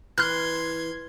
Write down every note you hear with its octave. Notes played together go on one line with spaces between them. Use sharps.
E3 C6 F6 F#6 G#6